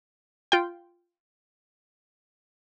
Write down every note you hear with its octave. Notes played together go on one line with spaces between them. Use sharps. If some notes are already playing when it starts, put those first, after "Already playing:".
F4 G5